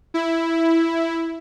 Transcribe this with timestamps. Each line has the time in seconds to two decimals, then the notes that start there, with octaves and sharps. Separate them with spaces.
0.14 E4